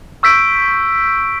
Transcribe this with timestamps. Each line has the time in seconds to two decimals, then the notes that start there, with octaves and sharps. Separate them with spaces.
0.23 C#6 E6 G6 B6 D7